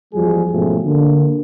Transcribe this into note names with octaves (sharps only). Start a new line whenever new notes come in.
E2 F3 G3 G#3 F#4 G#4
G#2 B2 F3 A3 C#4 G4
D3 A#3